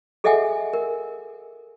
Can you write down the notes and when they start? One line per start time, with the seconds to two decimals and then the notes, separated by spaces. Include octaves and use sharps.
0.24 G#4 A4 D#5 E5 F#5 G#5
0.73 A#4